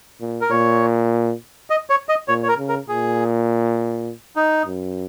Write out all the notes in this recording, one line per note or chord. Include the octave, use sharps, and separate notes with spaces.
A#2
A#4
A#2 C#5
D#5
C#5
D#5
A#2 C#5
C#5
A#4
C#3
A#4
A#2 G#4
D#4
F#2